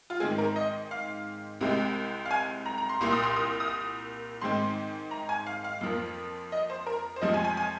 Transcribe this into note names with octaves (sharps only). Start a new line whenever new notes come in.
F4
G#2 D#3 G#3 C4 G#4
A#4
D#5
F5
C2 C3 G#3 C4
F5
G#5
A#5
A#5
C6
C2 A#2 A#3 C6
D#6
C6
D#6
D#6
G#2 D#3 G#3 C4 C6
A#5
G#5
F5
F5
F2 F3 A#3
D#5
C5
A#4
C5
F2 C3 F3 G#3 D#5
G#5
G#5
G#5